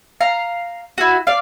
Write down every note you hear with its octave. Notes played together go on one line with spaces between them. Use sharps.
F5 A#5
E4 F#4
D5 F5